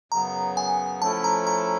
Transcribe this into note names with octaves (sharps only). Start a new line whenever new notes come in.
F#2 C#3 F#3 B3 A#5
G#5
F3 A3 C#4 E4 A4 A5
A#5
A#5